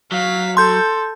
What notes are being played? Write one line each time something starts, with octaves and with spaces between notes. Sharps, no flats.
F#3 F5 B6
A4 C6 G6